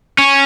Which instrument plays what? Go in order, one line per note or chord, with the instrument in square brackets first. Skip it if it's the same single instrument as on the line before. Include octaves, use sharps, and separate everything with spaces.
[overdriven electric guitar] C#4